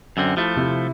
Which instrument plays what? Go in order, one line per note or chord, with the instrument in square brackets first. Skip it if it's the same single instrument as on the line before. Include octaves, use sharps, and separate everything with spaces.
[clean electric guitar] F#2 D3 C4
[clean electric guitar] F3 A3 [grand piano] E4
[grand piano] C3 E4